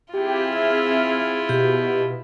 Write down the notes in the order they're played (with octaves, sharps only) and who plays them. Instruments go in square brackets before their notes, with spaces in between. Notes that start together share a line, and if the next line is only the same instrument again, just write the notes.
[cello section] C4 G#4 [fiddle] E4 F4 [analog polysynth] G4 G5
[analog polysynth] E5 F6
[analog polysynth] B2 [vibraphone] G4